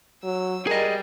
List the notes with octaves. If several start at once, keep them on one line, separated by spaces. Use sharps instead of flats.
F#3 E6
G3 G#4 A#4 D#5